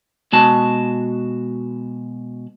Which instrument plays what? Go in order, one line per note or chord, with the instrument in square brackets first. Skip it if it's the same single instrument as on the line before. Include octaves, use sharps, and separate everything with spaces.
[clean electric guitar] B2 G#3 F#4 A5